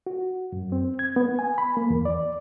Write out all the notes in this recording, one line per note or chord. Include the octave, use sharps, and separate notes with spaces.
F#4
F#2
C4
G#6
B3
G#5
B5
A#3
E2
D5